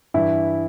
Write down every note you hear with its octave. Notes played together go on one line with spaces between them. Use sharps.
G2 E3 E4